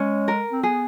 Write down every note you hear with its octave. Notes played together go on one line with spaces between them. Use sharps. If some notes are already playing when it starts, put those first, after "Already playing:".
Already playing: G#3 C#4
A#4
C4
B3 G#4